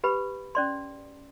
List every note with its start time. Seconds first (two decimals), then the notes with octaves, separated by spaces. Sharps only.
0.04 G4 B4 B5
0.55 C#4 D5 C6